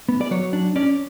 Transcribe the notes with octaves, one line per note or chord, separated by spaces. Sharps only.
B3
D5
F#3 C#5
D4
C#4 D5